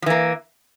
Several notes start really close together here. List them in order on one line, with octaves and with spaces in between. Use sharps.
F3 E3 A#3